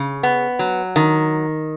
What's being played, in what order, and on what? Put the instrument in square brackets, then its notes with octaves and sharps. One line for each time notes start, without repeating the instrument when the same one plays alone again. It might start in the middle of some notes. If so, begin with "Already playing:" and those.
Already playing: [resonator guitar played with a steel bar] C#3
B3
F#3
D#3